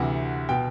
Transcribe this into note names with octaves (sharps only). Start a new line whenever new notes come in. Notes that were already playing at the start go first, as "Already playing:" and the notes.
Already playing: D2 C3 E3 F#5
B2 G5